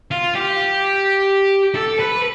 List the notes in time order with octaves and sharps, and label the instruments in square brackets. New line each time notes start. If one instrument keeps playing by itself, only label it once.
[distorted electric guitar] F4
G4
A4
B4